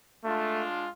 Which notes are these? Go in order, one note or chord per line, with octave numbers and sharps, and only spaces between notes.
G#3 A3 D4 F4